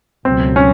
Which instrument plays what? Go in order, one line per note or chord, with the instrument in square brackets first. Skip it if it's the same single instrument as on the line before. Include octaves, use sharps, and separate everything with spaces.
[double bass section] C#2 B2 F#3 A3 [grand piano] C4
[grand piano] C#4